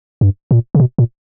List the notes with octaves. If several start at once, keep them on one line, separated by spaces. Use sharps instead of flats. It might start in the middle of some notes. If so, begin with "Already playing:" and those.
G2
A#2
C#3
B2
A#2